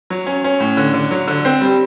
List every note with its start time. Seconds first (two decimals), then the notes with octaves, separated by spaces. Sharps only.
0.10 F#3
0.26 C#4
0.44 C#4
0.60 A2
0.77 D3
0.94 D3
1.11 F#3
1.28 D3
1.45 C4
1.61 G3